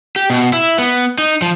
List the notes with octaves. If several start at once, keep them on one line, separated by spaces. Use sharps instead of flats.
G4
B2
E4
B3
D#4
F3